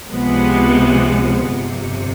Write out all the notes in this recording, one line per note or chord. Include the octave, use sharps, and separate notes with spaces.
C#2 C3 F3 G#3 B3
G1 F2 C3